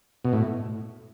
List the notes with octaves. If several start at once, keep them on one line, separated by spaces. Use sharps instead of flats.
B2
A2